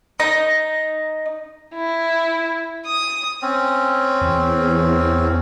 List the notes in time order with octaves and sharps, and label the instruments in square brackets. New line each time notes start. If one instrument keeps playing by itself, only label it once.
[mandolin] D#4 [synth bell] A#6
[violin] E4
D#6
[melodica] C4 C#4
[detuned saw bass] E2